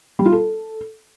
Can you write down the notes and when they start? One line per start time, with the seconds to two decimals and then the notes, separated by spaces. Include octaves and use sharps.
0.19 G3
0.26 F4
0.32 A4